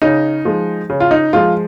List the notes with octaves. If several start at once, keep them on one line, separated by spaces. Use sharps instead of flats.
C#3 D#4
F3 G#3
C#3
F4
D#4
F3 G#3 F4